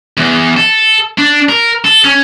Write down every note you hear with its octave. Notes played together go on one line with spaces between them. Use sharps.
E2
A4
D4
A#4
A4
C#4